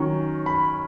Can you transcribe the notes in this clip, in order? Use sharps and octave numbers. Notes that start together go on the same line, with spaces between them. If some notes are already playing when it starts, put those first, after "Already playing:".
Already playing: D#3 F#3 C#4
B5